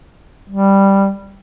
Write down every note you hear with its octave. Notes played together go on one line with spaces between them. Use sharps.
G3